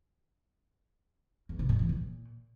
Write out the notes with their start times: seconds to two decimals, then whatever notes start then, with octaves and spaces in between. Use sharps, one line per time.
1.49 E2
1.59 C3
1.69 A2
1.79 E3
1.89 A#2